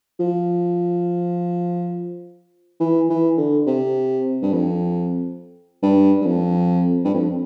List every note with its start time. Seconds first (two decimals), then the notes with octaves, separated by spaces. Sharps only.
0.19 F3
2.80 E3
3.09 E3
3.37 D3
3.67 C3
4.42 G2
4.53 F2
5.83 G2
6.21 G2
6.26 F2
7.05 G2
7.14 F2